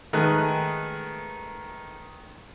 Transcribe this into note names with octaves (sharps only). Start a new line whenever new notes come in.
D#3 G#3 A3 B4 D#6 F#6